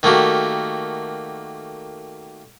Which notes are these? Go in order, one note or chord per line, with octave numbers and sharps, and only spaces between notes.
D#3 A3 A#3 F#4 G4